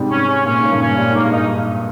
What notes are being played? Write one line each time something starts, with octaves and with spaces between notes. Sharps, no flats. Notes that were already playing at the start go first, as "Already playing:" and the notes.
Already playing: G#2 C3 G3
C#4
C#4
A#2 C#4
G#2
C#3
G2 A#2
C#4
A#2 G3
G#2 A#3
G2
D#4